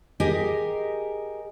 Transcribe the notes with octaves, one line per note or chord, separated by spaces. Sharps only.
G4 G#4 A#4 D#5 G#5